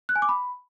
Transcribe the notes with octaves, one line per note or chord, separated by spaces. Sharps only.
F#6
G#5
D6
B5